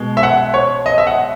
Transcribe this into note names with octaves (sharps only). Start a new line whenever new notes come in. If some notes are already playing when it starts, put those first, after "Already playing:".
Already playing: B2 G#3
E5
F#5
C#5
D#5
E5
F#5